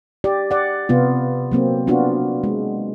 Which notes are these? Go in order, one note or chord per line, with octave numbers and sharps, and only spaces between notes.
G4 D5
D5 F#5
C3 B3 F4
F#3 A#3 C4
B3 D4 F4 F#4
G#3